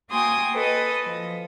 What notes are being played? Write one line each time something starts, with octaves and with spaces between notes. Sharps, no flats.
A#3 F#4 G5 G#5 C6 D#6
A4 B4 D#5
F3